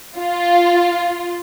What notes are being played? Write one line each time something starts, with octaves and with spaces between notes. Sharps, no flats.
F4